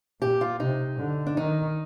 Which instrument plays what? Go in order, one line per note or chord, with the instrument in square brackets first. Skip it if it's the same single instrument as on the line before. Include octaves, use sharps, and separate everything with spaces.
[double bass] A#2 [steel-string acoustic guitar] G4
[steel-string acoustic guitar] F4
[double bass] C3 [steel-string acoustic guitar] D#4
[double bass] D3
[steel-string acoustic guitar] D4
[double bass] D#3 [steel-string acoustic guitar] D#4